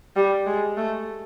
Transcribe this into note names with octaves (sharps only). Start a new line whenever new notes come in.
G3
G#3
A3